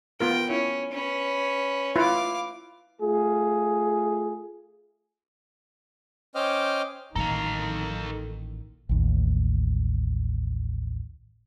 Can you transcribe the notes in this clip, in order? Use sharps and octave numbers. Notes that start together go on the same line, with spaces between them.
B3 F4 A#4 G5
C#4 E4
C#4 B4
E4 F4 B4 F5 D6
A3 F4 G#4
C#4 C5 D#5 G5 D6 F6
A1 A#2 D#3 A4 F5 A#5
A1 D#2